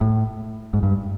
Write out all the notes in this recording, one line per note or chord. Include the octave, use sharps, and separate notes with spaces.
A2
G#2
G2